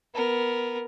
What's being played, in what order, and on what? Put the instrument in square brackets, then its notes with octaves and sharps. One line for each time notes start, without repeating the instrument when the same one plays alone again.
[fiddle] B3 A#4